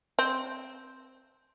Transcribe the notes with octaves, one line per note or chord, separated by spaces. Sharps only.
C4